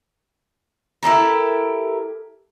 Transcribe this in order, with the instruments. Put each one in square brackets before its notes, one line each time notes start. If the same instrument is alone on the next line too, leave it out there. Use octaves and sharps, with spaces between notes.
[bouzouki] E4 G4 A4 A#4